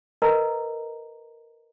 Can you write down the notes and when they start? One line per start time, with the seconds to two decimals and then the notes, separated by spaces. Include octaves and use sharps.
0.22 A#4 B4 D#5 A#5